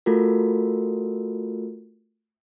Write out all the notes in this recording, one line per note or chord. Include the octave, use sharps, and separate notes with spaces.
A3 F4 F#4 A4 A#4